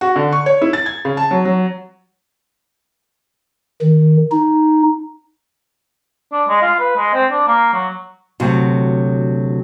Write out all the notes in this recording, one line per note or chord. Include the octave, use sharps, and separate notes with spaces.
F#4
D3
C#6
C#5
E4
A6
G#6
C#3
A5
F#3
F#3
D#3
D#4
D4
G#3
F4
B4
G#3
C4
D4
A#3
F#3
D2 C3 F#3